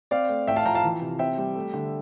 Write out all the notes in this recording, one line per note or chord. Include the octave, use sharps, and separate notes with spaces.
C4 D5 F5
A3
A1 E5 G5
F5 A5
F3 G5 A#5
F5 A5
E3
C3
C4 E5 G5
G3
A3
D3